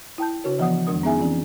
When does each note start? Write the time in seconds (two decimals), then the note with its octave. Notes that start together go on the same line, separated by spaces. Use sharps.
0.18 E4 G5 A5 G6
0.44 C#3 D4 F#4 A#4 C#5
0.59 E3 F3 B3 F#5 D#6
0.87 F2 D#3 G#3 D4 A#4 D#6
1.03 B3 C#4 D#4 G#4 E5 G#5
1.18 E3 C4 C#4 D#4 F4